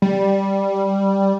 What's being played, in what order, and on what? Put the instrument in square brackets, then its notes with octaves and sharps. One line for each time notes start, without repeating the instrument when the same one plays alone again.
[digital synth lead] G3